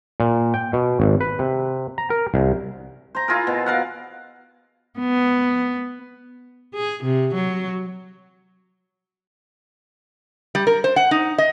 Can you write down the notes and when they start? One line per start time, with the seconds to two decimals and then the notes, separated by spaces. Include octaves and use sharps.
0.20 A#2
0.54 G5
0.73 B2
1.00 G#1
1.21 B4
1.39 C3
1.98 A#5
2.10 A#4
2.34 C2
3.15 C5 A#5
3.28 E4 F4 G#4 A#4
3.47 B2
3.66 A#4 F5 F#5
4.99 B3
6.75 G#4
7.04 C3
7.34 F#3
10.55 G3
10.67 A#4
10.84 C5
10.96 F#5
11.11 D#4
11.38 D#5